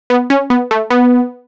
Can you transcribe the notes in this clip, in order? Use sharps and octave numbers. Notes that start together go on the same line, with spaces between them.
B3
C#4
B3
A3
B3